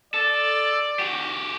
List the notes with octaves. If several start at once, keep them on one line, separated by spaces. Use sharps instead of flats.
A4 D5
F#4 G4